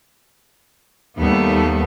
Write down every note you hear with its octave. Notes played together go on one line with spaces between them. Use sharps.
D#2 G3 A3 B3